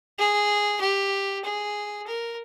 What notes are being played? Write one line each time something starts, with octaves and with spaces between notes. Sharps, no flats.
G#4
G4
G#4
A#4